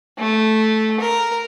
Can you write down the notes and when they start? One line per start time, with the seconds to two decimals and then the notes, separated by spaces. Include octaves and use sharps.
0.18 A3
1.01 A#4